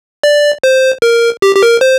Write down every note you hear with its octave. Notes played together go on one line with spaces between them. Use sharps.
D5
C5
A#4
G4
G4
A#4
C5